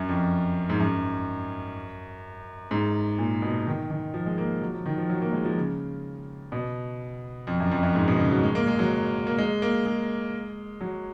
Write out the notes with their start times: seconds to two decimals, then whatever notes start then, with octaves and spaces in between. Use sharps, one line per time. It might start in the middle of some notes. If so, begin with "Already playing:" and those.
Already playing: F#2
0.09 F2
0.70 G#2
0.80 F#2
2.71 G#2
3.18 A#2
3.42 B2
3.67 D#3
3.90 D#3
4.14 F3
4.26 G#3
4.38 A#3
4.62 F#3
4.74 F3
4.86 D#3
4.98 F3
5.09 F#3
5.22 A#3
5.33 G#3
5.45 F3
5.57 C#3
6.52 B2
7.47 F2
7.60 F#2
7.71 F2
7.83 F#2
7.95 G#2
8.08 B2
8.19 C#3
8.31 F#3
8.43 G#3
8.55 A#3
8.67 G#3
8.79 F#3
9.27 A#3
9.38 G#3
9.62 A#3
9.86 G#3
10.81 F#3